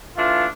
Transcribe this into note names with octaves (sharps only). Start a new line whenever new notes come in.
E3 A3 D4 F4